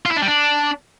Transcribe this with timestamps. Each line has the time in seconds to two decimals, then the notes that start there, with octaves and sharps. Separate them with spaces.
0.05 F4
0.11 E4
0.17 D4
0.22 G3
0.28 D4